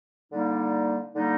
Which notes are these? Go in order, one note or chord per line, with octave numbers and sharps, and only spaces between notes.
D3 G3 A#3 D#4
D3 G3 A#3 D#4